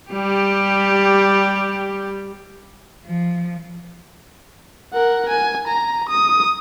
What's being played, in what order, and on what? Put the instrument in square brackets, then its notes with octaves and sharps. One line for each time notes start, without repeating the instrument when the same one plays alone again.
[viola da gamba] G3 G4
[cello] F3
[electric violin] A#4 F#5
G#5
A#5
D#6